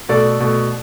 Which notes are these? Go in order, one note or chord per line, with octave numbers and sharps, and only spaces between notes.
B2 A3 A4 D5
B2 A3